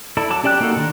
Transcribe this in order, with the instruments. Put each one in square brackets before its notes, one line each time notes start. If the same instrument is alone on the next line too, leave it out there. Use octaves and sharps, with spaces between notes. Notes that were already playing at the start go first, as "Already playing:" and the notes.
[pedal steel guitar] E4 A4 D5
F#3 A5 D6
C#4 G4 D5 G5 F#6
A#3 D#4 F#4 A4 F#5
D3 D#3 D4 A#4